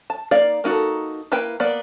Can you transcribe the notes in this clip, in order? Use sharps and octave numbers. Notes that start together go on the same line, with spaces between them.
A5
A#3 D#4 D5 F5
A#3 D#4 F#4 A4
A#3 E4 B4 G5
A#3 B3 D5